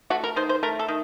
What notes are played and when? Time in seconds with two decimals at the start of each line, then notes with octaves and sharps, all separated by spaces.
0.10 A3 F#4
0.24 A#4
0.36 D#3 C5
0.49 C5
0.63 A3 A#4
0.79 A4
0.88 D#3